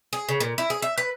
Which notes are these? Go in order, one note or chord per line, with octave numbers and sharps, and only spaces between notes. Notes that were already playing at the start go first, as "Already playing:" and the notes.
G#4
C#3
A#2
E4
G#4
E5
B4